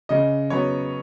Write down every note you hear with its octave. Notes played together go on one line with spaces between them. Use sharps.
C#3 D#5
F#3 B3 C#5